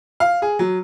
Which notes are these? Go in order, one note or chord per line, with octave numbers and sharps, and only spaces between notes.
F5
G#4
F#3